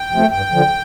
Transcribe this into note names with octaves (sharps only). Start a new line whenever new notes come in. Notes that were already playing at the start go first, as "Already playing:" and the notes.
Already playing: G5
C3 F3 A3
G2 G5
D3 F3